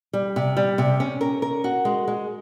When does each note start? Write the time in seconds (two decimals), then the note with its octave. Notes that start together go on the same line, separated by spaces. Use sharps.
0.13 G3
0.36 C3
0.57 G3
0.78 C3
1.00 C#4
1.21 A#4
1.42 A#4
1.64 F#4
1.85 G#3
2.08 G#3